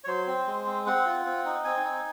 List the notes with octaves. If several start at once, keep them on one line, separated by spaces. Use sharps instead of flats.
C#5
F#3 C5
C4
G#3
C4
C4 F#5
F4
C4
D#4
C4 G#5
D#4